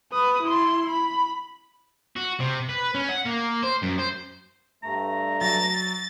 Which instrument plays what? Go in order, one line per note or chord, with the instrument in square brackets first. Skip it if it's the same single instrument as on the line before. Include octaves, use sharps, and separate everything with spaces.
[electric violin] B4 D#6
E4 C6
B5
[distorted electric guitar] F#4
C3
B4
C#4
F#5
A#3
C5
F#2
C5
[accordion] G2 A3 [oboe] A#5
[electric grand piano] F#3 A#6 [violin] A6